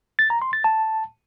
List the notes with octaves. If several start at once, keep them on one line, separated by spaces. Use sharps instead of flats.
A6
A#5
C6
A6
A5